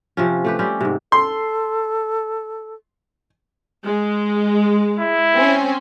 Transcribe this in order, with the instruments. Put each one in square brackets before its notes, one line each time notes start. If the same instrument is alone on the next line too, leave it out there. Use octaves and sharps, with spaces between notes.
[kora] C3 F3 C#4
A3 G4 B4
G3 C4 C#4 G4
G#2 C3
[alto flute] A4 [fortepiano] C6
[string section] G#3
[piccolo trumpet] E4
[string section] C4 C#4